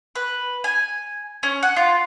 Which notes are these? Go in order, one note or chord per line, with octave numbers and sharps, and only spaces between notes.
B4
G#5
C#4
F#5
F4